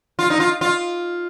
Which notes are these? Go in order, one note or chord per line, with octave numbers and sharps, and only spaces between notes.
F4
D#4
F4
F4